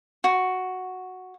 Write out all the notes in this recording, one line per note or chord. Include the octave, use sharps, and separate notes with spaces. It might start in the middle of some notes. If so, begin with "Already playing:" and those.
F#4